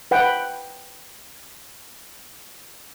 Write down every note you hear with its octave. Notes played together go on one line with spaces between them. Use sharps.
B4 F#5 G5